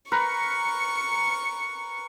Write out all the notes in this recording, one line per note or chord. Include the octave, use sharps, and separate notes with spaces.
A#4 B4 C#6 C#7